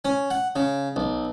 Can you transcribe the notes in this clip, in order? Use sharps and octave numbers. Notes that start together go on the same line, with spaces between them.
C#4
F#5
C#3
B1